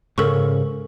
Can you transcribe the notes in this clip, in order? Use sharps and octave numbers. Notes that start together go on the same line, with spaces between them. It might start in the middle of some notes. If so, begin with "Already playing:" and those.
G#2 C#3 A4 A#4 C#6